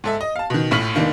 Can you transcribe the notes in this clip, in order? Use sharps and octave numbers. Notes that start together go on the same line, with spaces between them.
G#2 A4 E5
D#5
F5 A5
B2 D#3
A#1 A2 C#6 F6 B6 F#7
F1 D#3 A#3 D4